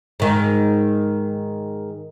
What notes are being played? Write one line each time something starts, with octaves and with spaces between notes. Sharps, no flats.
G#2 D#3